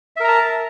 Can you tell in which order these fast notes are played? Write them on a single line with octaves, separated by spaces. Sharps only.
E5 A#4 A#5 A5